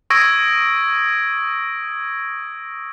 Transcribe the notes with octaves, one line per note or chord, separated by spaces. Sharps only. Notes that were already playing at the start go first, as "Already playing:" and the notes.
C#6 D#6 E6 G#6 A#6 D7